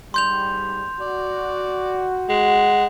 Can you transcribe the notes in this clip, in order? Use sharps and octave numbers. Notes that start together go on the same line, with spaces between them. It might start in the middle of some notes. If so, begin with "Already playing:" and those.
G#2 G3 C6 G6 F7
F#4 D5
G#3 F#5